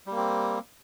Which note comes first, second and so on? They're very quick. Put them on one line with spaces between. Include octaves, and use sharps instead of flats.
G3 A#3 C4